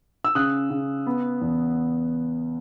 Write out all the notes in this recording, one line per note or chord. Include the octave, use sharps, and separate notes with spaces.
E6
C#3 D#6 F#6
C#3
B3
E2